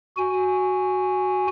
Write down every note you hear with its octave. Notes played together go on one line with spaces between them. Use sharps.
F#4 G#5